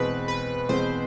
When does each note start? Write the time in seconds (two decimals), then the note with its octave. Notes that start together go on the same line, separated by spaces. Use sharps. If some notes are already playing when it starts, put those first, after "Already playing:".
Already playing: E2 B2 G#3 C4 B4
0.28 B4
0.69 E2 B2 G#3 C4 C5